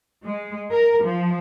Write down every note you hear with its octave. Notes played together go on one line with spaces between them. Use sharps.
G#3
A#4
F3